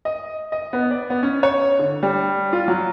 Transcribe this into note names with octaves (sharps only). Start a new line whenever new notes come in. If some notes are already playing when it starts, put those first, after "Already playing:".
D#5
D#5
B3
D5
B3
C#4
C#5
D3
G3
F4
F#3